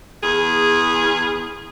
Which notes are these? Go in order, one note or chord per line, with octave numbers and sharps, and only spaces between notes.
E2 G#4